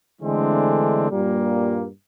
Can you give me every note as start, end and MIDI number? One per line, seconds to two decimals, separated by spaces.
0.22 1.11 50
0.22 1.11 52
0.22 1.11 56
0.22 1.11 57
0.22 1.11 60
0.22 1.11 62
1.11 1.87 43
1.11 1.87 46
1.11 1.87 55
1.11 1.87 58